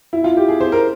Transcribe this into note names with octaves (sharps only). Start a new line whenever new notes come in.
E4
F4
G4
G#4
C5
A#4